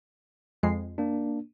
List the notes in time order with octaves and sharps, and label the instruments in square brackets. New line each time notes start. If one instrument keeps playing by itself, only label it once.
[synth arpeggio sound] F2 G#3 C7
[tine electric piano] A#3 D4